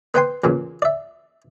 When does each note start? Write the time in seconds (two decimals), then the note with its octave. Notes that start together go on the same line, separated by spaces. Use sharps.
0.14 B3 B4 C5 G5 G#5 C6
0.44 E2 A#2 C#3
0.82 D5 E5